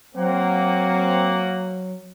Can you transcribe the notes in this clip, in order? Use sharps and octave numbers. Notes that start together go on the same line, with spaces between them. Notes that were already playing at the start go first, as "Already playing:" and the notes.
F#3 A#3 C4 F#5